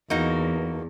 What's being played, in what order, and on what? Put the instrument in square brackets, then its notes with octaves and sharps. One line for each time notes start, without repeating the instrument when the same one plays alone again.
[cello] E2 [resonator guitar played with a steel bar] A#3 D#4 F#4